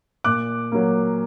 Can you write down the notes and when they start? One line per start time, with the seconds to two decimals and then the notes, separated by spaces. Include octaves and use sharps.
0.24 A#2 D6 F#6
0.72 F#3 A#3